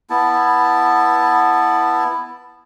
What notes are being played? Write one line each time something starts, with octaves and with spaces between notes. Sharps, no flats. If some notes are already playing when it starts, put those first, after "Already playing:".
B3 E4 A5